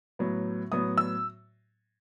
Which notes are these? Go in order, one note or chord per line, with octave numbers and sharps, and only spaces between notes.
A2 F#3 B3
A2 F#3 B3 D#6
E6